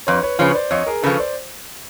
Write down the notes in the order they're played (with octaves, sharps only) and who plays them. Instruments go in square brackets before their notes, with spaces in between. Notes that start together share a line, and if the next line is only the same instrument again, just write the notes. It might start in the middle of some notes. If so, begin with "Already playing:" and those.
[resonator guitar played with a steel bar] F2 [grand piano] B4 C#5
[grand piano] B4 C#5
[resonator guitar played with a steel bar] C#3 F3 [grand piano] B4 C#5
[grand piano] C5 D5
[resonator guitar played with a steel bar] F2 [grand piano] C#5 D#5
[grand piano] G#4 A#4
[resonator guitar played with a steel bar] C#3 F3 [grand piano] A4 B4
[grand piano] C5 D5